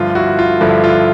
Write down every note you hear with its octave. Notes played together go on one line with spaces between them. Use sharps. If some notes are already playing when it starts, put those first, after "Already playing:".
Already playing: G2 D3 F3 A3 F4
E4 F#4
F4
G2 D3 F3 A3 E4
F4